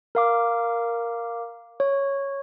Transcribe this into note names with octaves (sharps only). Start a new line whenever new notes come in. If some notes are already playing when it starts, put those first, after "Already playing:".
A#4 F5 D6
C#5